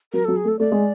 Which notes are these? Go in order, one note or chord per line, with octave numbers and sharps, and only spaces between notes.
F#3 A#4
F#3 A4
G#4
A3
A4
A3 D5
G#3